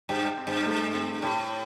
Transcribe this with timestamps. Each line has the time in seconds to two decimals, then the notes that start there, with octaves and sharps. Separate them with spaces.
0.09 G2 G4
0.38 C4
0.47 G2
0.66 A3
0.94 C4
1.22 A2 G4